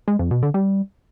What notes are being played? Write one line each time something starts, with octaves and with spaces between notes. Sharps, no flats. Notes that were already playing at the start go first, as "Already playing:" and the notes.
G#3
F2
B2
D3
G3